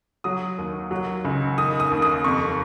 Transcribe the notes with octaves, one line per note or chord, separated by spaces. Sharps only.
F#3 D#6
D#2
F#3
C#2
D#3 D#6
D#6
D#2
D#6
F2 C#6